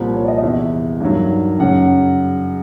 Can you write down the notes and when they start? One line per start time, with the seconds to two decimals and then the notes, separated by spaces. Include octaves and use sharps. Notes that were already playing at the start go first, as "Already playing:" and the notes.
Already playing: C2 A#2 F3
0.14 C#5
0.24 D5
0.28 D#5
0.38 D#5
0.42 E2 C3 E3 E5
1.00 G2 D#3 F#3
1.59 F#2 C#3 F#3 F#5